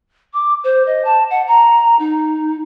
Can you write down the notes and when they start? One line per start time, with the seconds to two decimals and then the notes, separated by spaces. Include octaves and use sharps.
0.33 D6
0.64 C5
0.86 D#5
1.04 A5
1.30 F#5
1.47 A#5
1.99 D#4